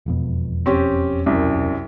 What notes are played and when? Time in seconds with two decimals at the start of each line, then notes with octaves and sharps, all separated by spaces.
0.06 E1 F2 B2
0.66 C4 C#4 G4
1.26 C2 F#2